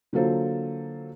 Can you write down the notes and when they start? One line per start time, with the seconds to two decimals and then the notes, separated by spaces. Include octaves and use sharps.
0.13 D3 F#3 A#3 F4 A4 C5